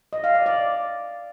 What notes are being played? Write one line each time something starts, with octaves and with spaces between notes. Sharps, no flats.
D#5
F5
D5
D5